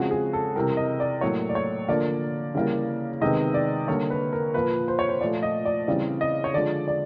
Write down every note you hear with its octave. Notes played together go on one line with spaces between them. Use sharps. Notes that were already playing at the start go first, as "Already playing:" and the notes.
Already playing: C#3 F3 G#3 C4 F#4
G#4
A4
C3 E3 G3 A#4
D#5
D5
A2 F#3 A#3 C#5
D5
C#5
D3 F3 A#3 D5
C#3 E3 G3 A#3
C3 D#3 G#3 B3 D#5
D5
D3 G3 A#3 C#5
B4
A#4
A#2 F3 A#3 B4
C5
C#5
C5
A#2 F3 A3 D5
D#5
D5
C#3 E3 G3 C4 D5
D#5
C#5
D3 F3 G#3 D5
D5